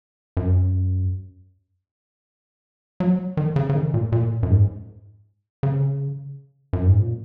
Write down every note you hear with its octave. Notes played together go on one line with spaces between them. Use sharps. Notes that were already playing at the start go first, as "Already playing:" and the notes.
F#2
F#3
D#3
C#3
C#3
D#3
A#2
A#2
F#2
G#2
C#3
F#2
G#2
A#2